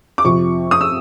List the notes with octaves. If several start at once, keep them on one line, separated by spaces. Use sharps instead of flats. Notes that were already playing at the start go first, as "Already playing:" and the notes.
D6
F2 C3 F3 C#6
D#6
E6